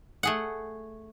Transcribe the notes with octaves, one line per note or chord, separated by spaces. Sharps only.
A3 G#4 F#5